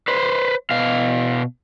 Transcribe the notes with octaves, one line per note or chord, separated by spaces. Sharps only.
B4 C5
B2 F5